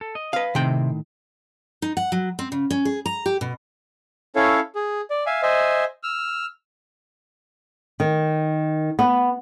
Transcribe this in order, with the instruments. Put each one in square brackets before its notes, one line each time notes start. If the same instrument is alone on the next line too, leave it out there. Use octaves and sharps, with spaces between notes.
[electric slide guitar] A4
D#5
[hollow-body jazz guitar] B4 F5
[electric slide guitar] A2 D#3 [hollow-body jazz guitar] C3 G5
[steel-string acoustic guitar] D#4
F#5
F#3
C4
C#3
C#4
G#4
A#5
G4
B2
[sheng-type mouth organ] C#4 E4 A4 C#5 F5
G#4
D5
E5 F5 G#5
C5 D#5 E5 G#5
E6 F6
[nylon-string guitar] D#3
B3